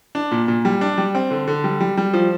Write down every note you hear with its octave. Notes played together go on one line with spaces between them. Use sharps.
D4
A#2
A#2
G3
D4
G3
C4
D3
D3
G3
G3
G3
F3